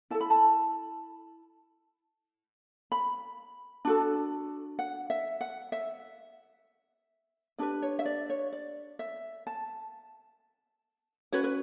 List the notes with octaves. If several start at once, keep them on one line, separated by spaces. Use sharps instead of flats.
E4 A4 A5
B5
A5
B5
D4 F#4 A4
F#5
E5
F#5
E5
D4 G4 B4 D5
C#5
E5
D5
C#5
D5
E5
A5
C#4 F#4 B4 C#5
B4